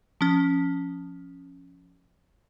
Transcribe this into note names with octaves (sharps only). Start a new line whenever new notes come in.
F3 C#4